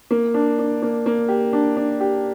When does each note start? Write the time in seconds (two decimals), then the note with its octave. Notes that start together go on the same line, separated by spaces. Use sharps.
0.11 A#3
0.34 D4
0.59 D4
0.82 A#3
1.06 A#3
1.28 G4
1.53 D4
1.77 D4
2.00 G4